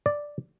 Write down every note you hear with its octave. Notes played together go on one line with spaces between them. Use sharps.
D5